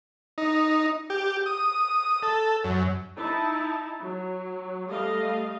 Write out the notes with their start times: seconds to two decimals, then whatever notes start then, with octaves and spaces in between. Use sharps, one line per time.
0.38 D#4
1.10 G4
1.46 D#6
2.23 A4
2.64 F#2
3.16 D#4 E4 A5
3.99 F#3
4.87 G3 A3 D#5 F5